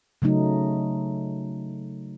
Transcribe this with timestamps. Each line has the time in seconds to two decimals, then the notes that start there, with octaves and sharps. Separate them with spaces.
0.22 C#3 F#3 A3 D#4